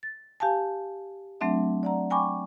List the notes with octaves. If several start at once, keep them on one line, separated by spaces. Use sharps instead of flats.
A6
G4 F5 G#5 A5
F#3 A3 C4 D4 E5
D5 F#5 A#5
G5 G#5 B5 C#6 D6